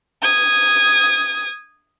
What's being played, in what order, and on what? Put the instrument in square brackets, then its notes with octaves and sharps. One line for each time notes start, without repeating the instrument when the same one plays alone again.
[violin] D#6 G#6